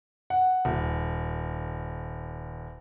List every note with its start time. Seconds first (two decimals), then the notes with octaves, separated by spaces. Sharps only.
0.30 F#5
0.65 D#1